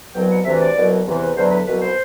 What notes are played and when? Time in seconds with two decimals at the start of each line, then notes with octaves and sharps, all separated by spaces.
0.14 C2 B2 F#3 G5
0.30 F#5
0.45 D2 C3 E3 E5
0.60 D5
0.76 C2 B2 F#3
1.06 E2 C3 E3
1.35 E2 D3 F#3 C5
1.50 B4
1.66 C2 B2 F#3 B4
1.80 C5